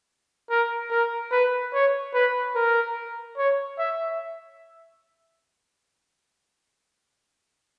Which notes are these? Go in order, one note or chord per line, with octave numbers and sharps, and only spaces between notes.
A#4
A#4
B4
C#5
B4
A#4
C#5
E5